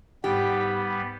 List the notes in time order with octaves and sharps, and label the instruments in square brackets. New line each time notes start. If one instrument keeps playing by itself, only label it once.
[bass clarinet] G#2 [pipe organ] G3 B3 [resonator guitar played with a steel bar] G4